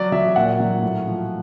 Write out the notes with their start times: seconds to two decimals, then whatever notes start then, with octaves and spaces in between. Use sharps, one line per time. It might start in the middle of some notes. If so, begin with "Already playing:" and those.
Already playing: F#3 D5
0.12 F#3 E5
0.36 A#2 F#5
0.60 F#3
0.82 A2
1.07 F3